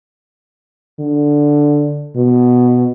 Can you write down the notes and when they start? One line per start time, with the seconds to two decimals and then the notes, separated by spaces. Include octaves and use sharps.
0.99 D3
2.16 B2